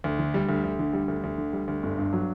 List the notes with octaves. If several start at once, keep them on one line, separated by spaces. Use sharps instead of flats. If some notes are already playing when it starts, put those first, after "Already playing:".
D2
D3
G3
D2
D2
D3
G3
D2
D2
D3
G3
D2
G1
G2
F#3